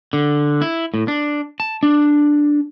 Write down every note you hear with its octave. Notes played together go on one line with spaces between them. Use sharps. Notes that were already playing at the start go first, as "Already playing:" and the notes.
D3
E4
A2
D4
A5
D4